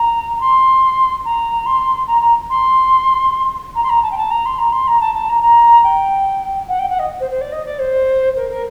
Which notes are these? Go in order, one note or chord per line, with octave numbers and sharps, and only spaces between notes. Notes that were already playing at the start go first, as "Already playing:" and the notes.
Already playing: A#5
A#5
C6
A#5
C6
A#5
A#5
C6
A#5
C6
A#5
A5
G5
A5
A#5
C6
A#5
C6
A#5
A5
A5
A#5
A#5
G5
F#5
G5
F#5
D#5
C5
C5
D5
D#5
D5
C5
A#4
A#4